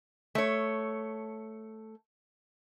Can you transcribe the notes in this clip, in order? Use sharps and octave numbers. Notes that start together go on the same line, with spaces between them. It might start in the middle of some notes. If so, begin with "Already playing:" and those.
A3 C#5